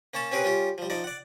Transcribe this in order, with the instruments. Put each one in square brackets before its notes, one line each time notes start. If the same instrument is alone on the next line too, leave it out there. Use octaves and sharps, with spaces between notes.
[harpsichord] A#3 C#4 C#5 A5
C4 C#4 G4 G#4 A#4 B4
G3 C#4 F4 G4
F3 G3
F3 D#4 D5
D5 F#5